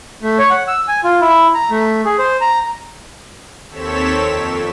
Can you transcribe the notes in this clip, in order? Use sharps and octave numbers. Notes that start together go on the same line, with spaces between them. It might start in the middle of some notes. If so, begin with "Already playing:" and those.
A3
C#5
F#5
E6
G#5
F4
E4
A#5
A3
G#4
C5
A#5
D#2 C4 A4 C#5 B6 E7
F2